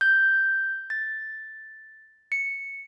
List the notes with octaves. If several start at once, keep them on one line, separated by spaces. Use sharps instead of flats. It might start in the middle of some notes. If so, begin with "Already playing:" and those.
G6
A6
C#7